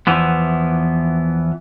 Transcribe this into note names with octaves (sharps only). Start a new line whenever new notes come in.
E2 E3 F3 B3